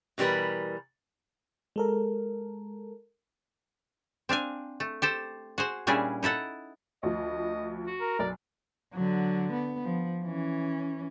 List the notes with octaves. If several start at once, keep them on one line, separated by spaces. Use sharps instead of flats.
B2 E3 G3 A#4 B4
G#3 A4 A#4
C4 D4 F5 G#5
A3
G4 A4 C5
F#4 G#4 C5
A#2 G3 C#4 D4 E4 G#4
D#4 E4 A4 F#5
D2 F3 D#5
F#4
A#4
B1 D5
D3 F#3
B3
F3
E3 C#4